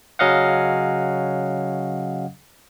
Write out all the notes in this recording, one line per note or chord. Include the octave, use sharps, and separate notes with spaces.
C#3 F#3 C#4 D#5 F5 F#5